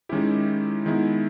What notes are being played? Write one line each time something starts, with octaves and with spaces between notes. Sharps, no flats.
D#3 G#3 C#4 E4 G4
D#3 G#3 B3 E4